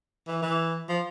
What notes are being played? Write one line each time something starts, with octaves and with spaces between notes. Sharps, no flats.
E3
E3
F3